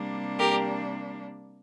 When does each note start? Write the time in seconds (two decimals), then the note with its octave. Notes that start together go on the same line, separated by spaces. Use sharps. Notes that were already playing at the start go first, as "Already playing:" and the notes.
Already playing: C3 G3 A#3 D4
0.39 G4 A#4